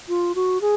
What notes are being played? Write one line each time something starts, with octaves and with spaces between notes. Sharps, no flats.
F4
F#4
G#4